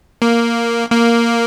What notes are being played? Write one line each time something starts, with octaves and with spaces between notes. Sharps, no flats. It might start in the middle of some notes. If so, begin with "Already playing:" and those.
A#3
A#3